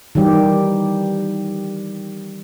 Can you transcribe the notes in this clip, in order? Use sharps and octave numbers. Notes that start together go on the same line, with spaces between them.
D#3 E3 G3 G4